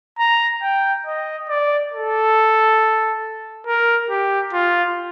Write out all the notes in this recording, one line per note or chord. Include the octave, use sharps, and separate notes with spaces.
A#5
G5
D#5
D5
A4
A#4
G4
F4